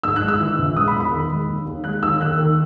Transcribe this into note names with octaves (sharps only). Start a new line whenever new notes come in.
G#2 E6
F#6
G#3
E6
E3
A#1
G#3 D#6
B5
E2
B5
D#3
G#3
D#2
D#2
G#3 F#6
D#2 E6
D#3 F#6
D#3